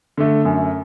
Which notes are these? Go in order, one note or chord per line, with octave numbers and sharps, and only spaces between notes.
D3 A3
F#2